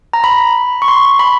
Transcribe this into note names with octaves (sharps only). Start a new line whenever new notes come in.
A#5
B5
C#6
C6
B5